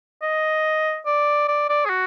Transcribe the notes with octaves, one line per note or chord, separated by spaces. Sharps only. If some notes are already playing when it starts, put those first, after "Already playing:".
D#5
D5
D5
D5
G#4
F#4